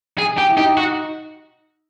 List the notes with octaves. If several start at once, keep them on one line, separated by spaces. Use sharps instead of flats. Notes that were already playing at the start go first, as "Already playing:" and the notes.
G#4
G4
E4
D#4 G4
F#4